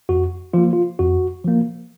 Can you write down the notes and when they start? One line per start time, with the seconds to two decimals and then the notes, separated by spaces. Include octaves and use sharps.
0.09 F2 F#4
0.53 F3 A#3 F4
0.73 F4
0.99 F2 F#4
1.44 F3 A#3